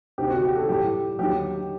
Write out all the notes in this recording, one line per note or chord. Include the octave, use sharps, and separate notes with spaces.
D2 C3 D#3 G4
F#4
G4
A4
A2 G3 G4
D#2 D3 F#3 G4